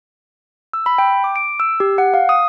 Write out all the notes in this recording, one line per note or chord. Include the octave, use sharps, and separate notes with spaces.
E6
B5
G5
D6
D7
E6
G4
F#5
F5
D#6